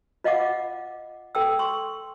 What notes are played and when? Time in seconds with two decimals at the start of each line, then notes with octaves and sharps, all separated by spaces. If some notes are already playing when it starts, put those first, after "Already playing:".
0.24 F4 D#5 F5 F#5 D6
1.35 A4 G5 E6
1.59 C6 C#6